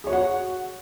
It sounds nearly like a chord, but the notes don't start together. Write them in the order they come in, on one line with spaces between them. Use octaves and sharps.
G#4 C#5 F#4 F#5